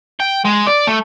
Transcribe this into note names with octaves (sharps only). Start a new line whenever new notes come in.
G5
G#3
D5
A3